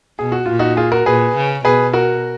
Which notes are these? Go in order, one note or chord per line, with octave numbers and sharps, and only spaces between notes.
B2 G#4
F#4
A#2 F4
D#4 F#4
F4 G#4
F#4 A#4
A#2 G#4 B4
C#3
B2 G#4 B4
F#4 A#4